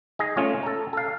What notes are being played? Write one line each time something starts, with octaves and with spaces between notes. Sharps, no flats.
D#4 G#4 A#5
A3 C#4 F4 C#5
A4 A#5
A4 F5